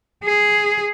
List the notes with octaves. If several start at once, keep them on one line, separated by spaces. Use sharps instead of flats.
G#4